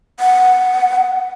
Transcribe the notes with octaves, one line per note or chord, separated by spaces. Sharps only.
F#5